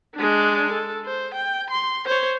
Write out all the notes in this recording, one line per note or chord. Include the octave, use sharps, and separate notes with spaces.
G#3 D4
A4
C5
G5
C6
C5 C#5